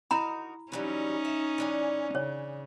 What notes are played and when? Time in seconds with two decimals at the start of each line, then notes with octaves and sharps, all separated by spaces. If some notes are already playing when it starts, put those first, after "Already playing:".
0.11 D#4 E4 F#4 A#4 A#5 B5
0.72 E3 F#3 G3 C#4 D#4
1.25 E5
1.58 E3 D4 G#5
2.15 C#3 C#5